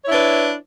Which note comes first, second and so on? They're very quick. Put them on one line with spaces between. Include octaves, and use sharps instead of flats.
C#5 E4 D4 B4